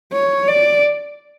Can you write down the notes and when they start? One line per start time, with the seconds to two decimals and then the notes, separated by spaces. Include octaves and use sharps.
0.12 C#5
0.48 D5